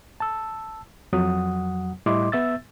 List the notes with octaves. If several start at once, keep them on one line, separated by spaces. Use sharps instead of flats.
A5 E6
F2 F#3 F#5 D#6
A2 G3 E4 D#5 C6 D6
B3 E5 E6 A6